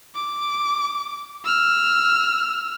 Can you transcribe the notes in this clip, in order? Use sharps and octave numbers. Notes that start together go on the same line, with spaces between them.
D6
E6 F6